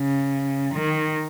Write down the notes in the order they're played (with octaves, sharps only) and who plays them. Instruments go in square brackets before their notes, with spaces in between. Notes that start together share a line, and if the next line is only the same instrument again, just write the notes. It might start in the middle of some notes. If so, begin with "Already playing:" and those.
Already playing: [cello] C#3
D#3